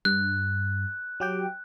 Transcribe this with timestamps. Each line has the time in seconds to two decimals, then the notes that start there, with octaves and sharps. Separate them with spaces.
0.05 G2 F#6
1.20 F#3 G4 G5